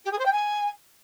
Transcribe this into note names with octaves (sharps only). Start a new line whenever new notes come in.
G4
G#4
C5
G5
G#5